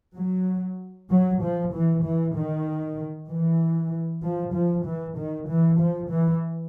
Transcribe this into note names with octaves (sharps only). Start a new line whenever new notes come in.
F#3
F#3
F3
E3
E3
D#3
E3
F3
F3
E3
D#3
E3
F3
E3